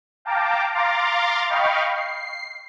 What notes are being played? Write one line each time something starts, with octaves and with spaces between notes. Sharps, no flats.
F5 G5 A5 A#5 D6
F5 A#5 C6 D6 A6
D#5 F5 G5 B5 C#6
C7